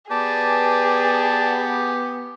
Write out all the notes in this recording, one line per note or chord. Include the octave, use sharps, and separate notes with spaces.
B3 G4 G#4 D5 A5